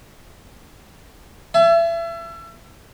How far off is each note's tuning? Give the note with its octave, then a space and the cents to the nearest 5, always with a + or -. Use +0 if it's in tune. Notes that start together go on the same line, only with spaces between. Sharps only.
E5 +30 G#5 +45